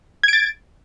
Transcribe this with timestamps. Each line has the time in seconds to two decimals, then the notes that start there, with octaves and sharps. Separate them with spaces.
0.23 G#6
0.28 D7
0.33 A6